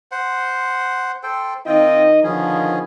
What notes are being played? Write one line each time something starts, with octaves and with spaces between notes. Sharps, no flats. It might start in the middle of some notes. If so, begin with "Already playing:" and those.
C5 F#5
A4 C5 G5
D#3 C4 D#4 F4 D#5 G5
D3 D#3 F3 B3 C#4 G#4